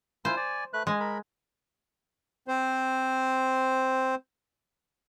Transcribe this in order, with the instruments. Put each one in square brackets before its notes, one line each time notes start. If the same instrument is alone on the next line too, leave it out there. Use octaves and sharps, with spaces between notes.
[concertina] E4 F4 G#5 [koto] C5
[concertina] D5 G#5
A3 B4 F#6
[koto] G#3 [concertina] G#5
[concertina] A#4 B5
[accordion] C4 C5